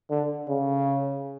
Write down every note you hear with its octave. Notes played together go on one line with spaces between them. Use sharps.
D3
C#3